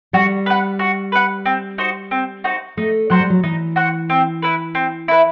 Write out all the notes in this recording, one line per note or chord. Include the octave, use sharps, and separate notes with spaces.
G3 F#4
B4 F#5
F#4
B4 F#5
C4
D#4 F#4 C5
C4
D#4 F#4 C5
A3 D#4
F#3 F#4 C5 F#5
G3
F#3
E3 D#4
F#4 C5 F#5
C4
E4 B4
C4
E4 B4